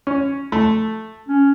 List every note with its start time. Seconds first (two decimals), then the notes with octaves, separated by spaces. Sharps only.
0.07 C#4
0.52 A3
1.29 C#4